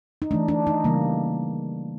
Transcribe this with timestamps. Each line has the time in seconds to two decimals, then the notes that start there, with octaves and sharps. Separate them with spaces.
0.22 D#4
0.31 E3 A3 D4
0.48 D4
0.67 D#4
0.84 C#3 E3 G3 A#3